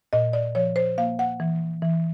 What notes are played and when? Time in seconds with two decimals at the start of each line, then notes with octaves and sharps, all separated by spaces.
0.13 A#2 D#5
0.33 D5
0.55 F3 C#5
0.76 C5
0.98 A#3 F5
1.19 F#5
1.40 E3
1.82 E3